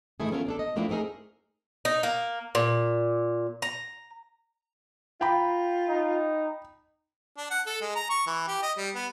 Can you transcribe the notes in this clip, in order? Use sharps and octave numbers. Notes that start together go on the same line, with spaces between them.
G#2 D#3 E3 A3 E4 G#4
B3 C#4 E4 F4 A4 A#4
A#3 D4 A4
D#5
F3 A3 A#3 C4 D4 E4
A3 C4 D#4 G#4 A#4
D#4
A#3
A#2
A#5
F4 G5 A#5 B5
D#4
D4
F#5
A4
G#3
A#5
C#6
E3
G4
D#5
G3
B3